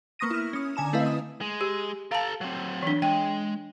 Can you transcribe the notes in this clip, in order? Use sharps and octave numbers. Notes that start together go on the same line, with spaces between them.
A#3 B3 C#6 D#6 A#6 D#7
E4 F6
C#4 D#6
D3 G#5 A#5 E7
A3 C4 E4 B4 D#5 F5
D#6
G#3
G4
A4 F5 A5 A#5
F#3 C4
E3 D4
G#3 G5